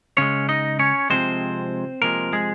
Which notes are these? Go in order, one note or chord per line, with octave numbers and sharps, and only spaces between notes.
C#3 G#3 C#4 C#5
D#4 D#5
C#4 C#5
C3 F3 G#3 C4 C5
C3 F3 G#3 A#3 A#4
G#3 G#4